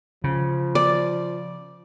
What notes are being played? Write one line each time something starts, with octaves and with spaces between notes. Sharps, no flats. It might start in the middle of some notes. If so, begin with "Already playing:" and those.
C#3 F3
D5